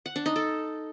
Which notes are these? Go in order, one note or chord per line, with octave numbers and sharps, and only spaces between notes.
F#5
D4
D#4
A4